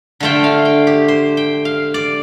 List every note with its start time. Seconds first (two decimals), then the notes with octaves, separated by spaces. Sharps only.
0.20 D3 A3 F4 G5
0.44 F5
0.65 G5
0.87 G4
1.08 C5
1.37 G5
1.65 F5
1.94 D5